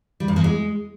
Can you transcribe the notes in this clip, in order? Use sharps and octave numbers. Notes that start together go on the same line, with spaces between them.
G3
F#2
E2
G#3